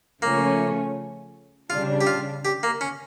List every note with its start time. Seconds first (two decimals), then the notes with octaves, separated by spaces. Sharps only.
0.22 C#3 F3 A3 A#3 C#4
1.70 C#3 G3 D4 F4
2.01 G4
2.07 F4
2.45 G4
2.63 A#3
2.81 C#4